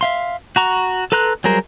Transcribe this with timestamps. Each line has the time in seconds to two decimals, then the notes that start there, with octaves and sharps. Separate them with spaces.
0.01 E5 F5 C6
0.56 F#4 A#5 C#6
1.12 A4 B4 A#5 C6 F#6
1.44 F#3 G3 G#4 A#4 C5